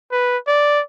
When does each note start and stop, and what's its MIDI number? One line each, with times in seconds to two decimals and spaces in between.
0.12 0.37 71
0.47 0.81 74